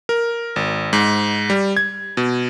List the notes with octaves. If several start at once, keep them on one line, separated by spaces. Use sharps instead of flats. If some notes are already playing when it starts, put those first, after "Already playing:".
A#4
G#1
G#2
G3
G#6
B2